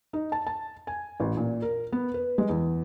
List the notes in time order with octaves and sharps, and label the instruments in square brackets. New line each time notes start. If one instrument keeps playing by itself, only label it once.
[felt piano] D#4
A5
A5
G#5
A1
A#2
A#4
B3
B4
G#3
E2